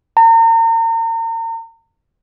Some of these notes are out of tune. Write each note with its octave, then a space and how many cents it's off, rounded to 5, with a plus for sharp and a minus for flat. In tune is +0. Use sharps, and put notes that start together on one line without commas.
A#5 -40